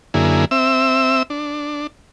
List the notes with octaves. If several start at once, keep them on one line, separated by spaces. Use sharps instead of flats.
F#2 D3 A#3 E4 G#4
C4 E5 E6
D4